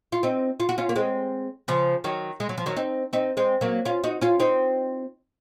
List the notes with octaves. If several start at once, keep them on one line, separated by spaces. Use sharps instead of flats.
F4
C4 D#4
F4
F#4
C#4 F4
A#3
G#3 C4
C#3 F3
D#3 F#3
G#3
F#3
F3
D#3 F#3
C4 D#4
C4 D#4
G#3 C4
F#3 A#3
C#4 F4
D#4 F#4
C#4 F4
C4 D#4